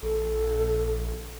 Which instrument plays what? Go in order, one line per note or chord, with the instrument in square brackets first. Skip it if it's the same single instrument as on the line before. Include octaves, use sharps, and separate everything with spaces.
[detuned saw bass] A#1 [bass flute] A4